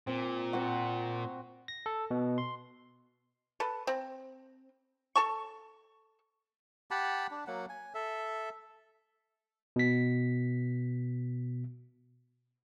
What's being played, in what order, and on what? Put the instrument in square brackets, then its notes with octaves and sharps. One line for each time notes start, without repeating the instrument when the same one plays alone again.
[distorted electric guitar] A#2 [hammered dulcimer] C4
[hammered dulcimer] C4 F#4
[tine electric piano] A#6
A4
B2
C6
[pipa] A4 B4
C4
A4 A5 C#6
[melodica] G4 F#5 A5 B5
D4
F#3 A#3 F#5
G#5
A4 E5
[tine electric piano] B2 B6